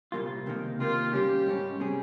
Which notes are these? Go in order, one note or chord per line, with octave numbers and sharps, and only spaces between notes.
C2 A#2 G3 A#3 F4
C#2 C3 D#3 A#3
C#2 C3 D#3 A#3 F4
G#2 G3 C#4 G4
G#2 G3 C#4
C3 G3 C#4 G#4